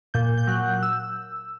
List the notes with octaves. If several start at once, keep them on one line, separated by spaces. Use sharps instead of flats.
A#2 G6
G6
F#3 F#6
E6